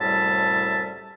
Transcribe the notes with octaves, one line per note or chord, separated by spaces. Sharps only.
C2 F#2 A2 G3 E5 A5